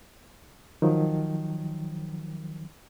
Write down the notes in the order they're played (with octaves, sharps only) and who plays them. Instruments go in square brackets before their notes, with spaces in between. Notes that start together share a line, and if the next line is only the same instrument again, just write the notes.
[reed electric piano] D#3 F3 F#3